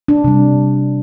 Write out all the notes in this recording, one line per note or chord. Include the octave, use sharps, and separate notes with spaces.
D4
C3 G3